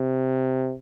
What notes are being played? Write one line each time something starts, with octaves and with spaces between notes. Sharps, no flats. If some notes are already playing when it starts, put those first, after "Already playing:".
Already playing: C3